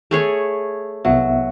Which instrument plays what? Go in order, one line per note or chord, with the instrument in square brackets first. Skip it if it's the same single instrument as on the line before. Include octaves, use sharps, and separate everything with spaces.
[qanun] A3 G#4 C#5
[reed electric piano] C2 B3 E5 [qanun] F#3